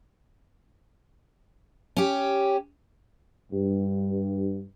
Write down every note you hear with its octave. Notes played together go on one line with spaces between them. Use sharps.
C#4 G4
G2